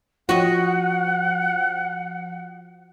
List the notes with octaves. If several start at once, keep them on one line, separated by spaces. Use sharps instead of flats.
F3 F#4 D#5 F#5